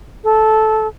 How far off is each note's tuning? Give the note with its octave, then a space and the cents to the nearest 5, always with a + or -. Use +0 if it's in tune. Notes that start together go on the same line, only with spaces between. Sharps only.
A4 -15